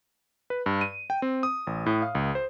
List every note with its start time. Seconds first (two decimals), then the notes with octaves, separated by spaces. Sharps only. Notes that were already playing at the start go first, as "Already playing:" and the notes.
0.50 B4
0.66 G2
0.81 D#7
1.10 G5
1.22 C4
1.43 D#6
1.67 A1
1.86 A2
2.02 F5
2.15 C#2
2.35 C5